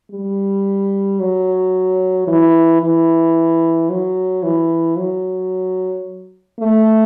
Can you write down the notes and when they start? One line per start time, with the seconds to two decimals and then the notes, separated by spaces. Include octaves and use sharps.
0.11 G3
1.20 F#3
2.27 E3
2.81 E3
3.90 F#3
4.43 E3
4.97 F#3
6.60 A3